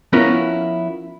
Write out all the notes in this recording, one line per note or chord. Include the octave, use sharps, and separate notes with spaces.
F3 B3 C#4 E4 F4 A#4